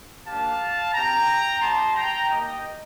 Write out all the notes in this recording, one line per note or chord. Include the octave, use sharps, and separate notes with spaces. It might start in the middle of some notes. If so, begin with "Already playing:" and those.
A#3 D4 G4 F5 A5
C4 G4 G5 A#5
G3 C4 D#4 G4 A5 C6
G5 A#5
A#3 D#4 G4 D#5 G5